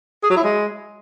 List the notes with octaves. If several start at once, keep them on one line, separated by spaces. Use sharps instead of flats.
G#4
F#3
E4
G#3